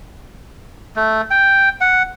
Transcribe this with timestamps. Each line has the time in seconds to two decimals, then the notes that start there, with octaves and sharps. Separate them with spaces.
0.96 A3
1.31 G5
1.81 F#5